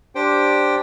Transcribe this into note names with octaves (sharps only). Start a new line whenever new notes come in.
D4 G4 C5 G5